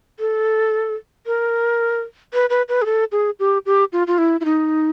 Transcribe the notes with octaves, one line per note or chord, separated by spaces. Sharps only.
A4
A#4
B4
B4
B4
G#4
A4
G#4
G4
G4
F4
F4
E4
E4
D#4